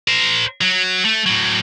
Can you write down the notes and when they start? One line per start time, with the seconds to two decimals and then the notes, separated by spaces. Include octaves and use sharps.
0.08 A#4 C5
0.61 F#3
1.05 A3
1.26 A2 F#3